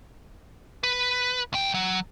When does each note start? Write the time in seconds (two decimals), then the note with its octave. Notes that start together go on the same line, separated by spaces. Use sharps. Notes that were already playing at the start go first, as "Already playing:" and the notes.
0.83 B4
1.53 C#2 G5
1.74 F#3